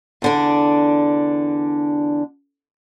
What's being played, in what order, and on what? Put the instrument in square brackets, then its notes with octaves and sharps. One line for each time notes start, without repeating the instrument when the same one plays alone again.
[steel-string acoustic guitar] E2 D3 D4